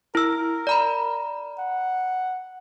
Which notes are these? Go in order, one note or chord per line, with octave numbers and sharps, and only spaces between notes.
E4 A#4 E6
D5 A#5 B5
F#5